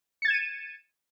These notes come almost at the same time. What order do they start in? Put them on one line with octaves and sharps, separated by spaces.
C#7 A6 G#6 E7 D#7